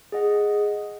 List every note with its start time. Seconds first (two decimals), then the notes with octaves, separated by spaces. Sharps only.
0.12 G#4 D#5 F#5